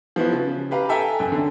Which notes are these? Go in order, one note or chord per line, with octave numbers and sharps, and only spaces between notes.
F3 B3 E4 F#4
C#3
G4 B4 F5 A#5
A4 E5 G5 G#5 A#5
F#2
D3